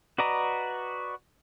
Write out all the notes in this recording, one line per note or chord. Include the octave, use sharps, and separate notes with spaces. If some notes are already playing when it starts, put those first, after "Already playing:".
F#4 B4 D5 D#5 A#5